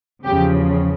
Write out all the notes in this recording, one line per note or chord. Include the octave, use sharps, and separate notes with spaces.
E2 C#3 F3 G4